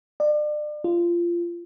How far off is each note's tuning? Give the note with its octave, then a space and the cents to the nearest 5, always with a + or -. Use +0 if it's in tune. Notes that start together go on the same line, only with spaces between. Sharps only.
D5 +35
F4 -20